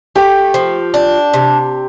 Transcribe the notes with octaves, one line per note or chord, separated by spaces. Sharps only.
A3 G4
F3
D4
C3